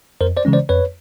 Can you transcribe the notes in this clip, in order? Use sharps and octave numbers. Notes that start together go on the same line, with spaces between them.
F2 A#4 C5
C5 D5
C#3 E3 G#3 C#4
C5 D5
F2 B4 C#5